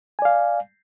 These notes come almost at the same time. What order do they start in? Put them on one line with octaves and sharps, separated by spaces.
G#5 D5 F5